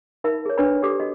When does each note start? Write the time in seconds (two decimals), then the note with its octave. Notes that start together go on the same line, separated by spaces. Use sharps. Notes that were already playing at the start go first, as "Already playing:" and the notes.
0.24 D#4 A#4 E5 B5
0.46 G#4 C#5
0.58 D4 B4 C#5 D5 B5
0.83 G4 A4 D5 D6
1.00 F#4 D#5